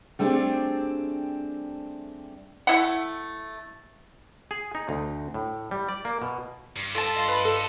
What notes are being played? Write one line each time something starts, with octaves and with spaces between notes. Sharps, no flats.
G3 A3 C4 D4 G4 G#4
A3 E4 F#5
G#4
D#4
D2
A2
G3
D5
A#3
B2
G2
F4 A4 A5
D#5 F5 C6
B4
A4